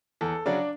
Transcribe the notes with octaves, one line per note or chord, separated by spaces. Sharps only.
E2 A4
C#3 F#3 D4 D5